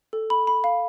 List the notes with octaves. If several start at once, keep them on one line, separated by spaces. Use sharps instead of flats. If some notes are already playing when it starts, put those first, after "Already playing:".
A4
B5
B5
F5